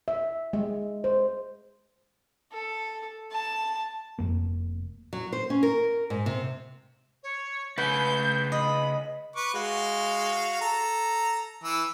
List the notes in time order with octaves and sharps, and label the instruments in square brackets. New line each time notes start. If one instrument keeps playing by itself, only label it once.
[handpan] E5
G#3
C5
[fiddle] A4
A5
[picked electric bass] F1 F2 A#3
[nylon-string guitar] F#3
C5
C#4
A#4
G#2
C3
[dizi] C#5
[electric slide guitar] C#3 B4 [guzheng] F#5 [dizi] G6
[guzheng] D#5 [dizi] B5
[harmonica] B4 C#6 D6
G#3 F#4 F5
A4 A#5
E3 E6